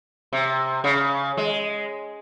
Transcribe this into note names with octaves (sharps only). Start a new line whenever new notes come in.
C3
C#3
G#3